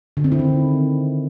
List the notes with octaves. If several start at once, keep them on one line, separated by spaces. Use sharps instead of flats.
D3
C4
E4
D#3